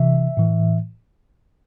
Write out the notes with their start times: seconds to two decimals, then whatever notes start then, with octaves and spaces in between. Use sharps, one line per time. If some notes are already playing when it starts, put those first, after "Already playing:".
Already playing: C3 E3 E5
0.37 A2 E3